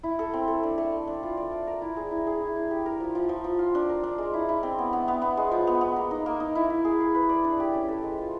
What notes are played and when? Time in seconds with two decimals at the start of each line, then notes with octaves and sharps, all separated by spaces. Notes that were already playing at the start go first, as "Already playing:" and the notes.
0.03 E4
0.19 A4
0.33 C4
0.48 A4
0.63 D4
0.78 A3
0.92 A3
1.07 D4
1.23 F4
1.37 D5
1.51 F4
1.67 A#4
1.82 E4
1.96 G#4
2.11 E4
2.27 G#4
2.41 E4
2.55 E4
2.71 G4
2.86 A#4
3.00 F3
3.15 F3
3.29 F3
3.44 F3
3.59 F4
3.75 D4
3.89 A#4
4.03 D4
4.18 G#3
4.34 E4
4.49 E4
4.63 C4
4.78 B3
4.93 B3
5.08 B3
5.22 B3
5.37 G#3
5.51 F3
5.67 B3
5.81 B3
5.96 A#3
6.11 D#4
6.26 A#3
6.40 D#4
6.55 E4
6.70 E4
6.85 G#4
7.00 G#4
7.15 B4
7.29 D5
7.44 D4
7.60 G4
7.74 C#4
7.88 A4
8.03 G#3
8.18 F4